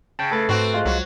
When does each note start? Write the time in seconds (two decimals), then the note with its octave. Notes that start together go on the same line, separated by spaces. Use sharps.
0.19 C#3 G5 A5
0.31 A3 A4 B4 A6
0.49 G#2 C4 F#4
0.74 G#3 F4
0.85 C2 F#3